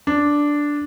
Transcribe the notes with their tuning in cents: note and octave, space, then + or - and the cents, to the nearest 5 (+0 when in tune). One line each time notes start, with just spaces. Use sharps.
D4 -5